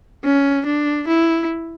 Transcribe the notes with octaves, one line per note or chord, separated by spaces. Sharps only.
C#4
D4
E4